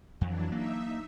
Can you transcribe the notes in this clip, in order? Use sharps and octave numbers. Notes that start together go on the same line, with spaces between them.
F2 E3 F#3 D4
A#3 D#4 E5